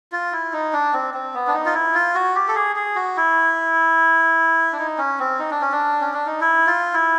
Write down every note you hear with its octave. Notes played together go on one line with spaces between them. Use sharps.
F4
E4
D#4
D4
C4
C4
B3
D4
D#4
F4
E4
F4
F#4
G4
A4
G#4
G#4
F#4
E4
D4
D#4
C#4
C4
D#4
D4
C#4
D4
C#4
D4
D#4
E4
F4
E4